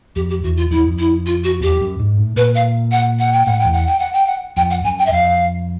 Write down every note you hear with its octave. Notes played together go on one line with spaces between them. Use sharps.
F2 G4
G4
E2 F#4
F4
F2 E4
E2
F2
E4
F4
F#4
E2 G4
F2
F#2
G#2
A2
A#2 B4
F5
F#5
F#5
G5
A2 F#5
G5
E2
F#5
G5
F#5
G5
F#5
F2 G5
F#5
F#2 G#5
G5
E5
F2 F5